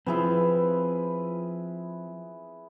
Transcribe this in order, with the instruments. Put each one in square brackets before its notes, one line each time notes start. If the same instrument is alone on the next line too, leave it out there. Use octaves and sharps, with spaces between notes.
[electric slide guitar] F3 C4 [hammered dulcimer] E4 G#4 B4